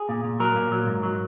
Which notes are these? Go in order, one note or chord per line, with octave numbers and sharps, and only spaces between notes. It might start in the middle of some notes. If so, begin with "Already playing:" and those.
Already playing: G#4
A#2
A#2
F#3 A#4
A#2
F#3
G#2
F#3